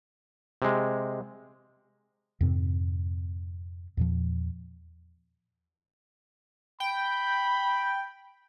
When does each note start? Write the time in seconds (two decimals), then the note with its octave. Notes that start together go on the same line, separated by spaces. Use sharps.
0.62 C3 G#3
2.41 F2 G#2 C3 C4
3.97 E2 A#2 F3
6.80 G5 B5